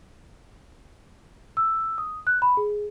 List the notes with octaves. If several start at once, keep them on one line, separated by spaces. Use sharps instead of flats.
E6
D#6
F#6
B5
G#4